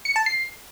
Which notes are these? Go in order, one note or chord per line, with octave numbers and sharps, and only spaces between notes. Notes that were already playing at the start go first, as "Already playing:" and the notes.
C#7
A5
C7